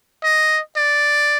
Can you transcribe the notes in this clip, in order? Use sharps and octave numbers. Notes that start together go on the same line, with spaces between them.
D#5
D5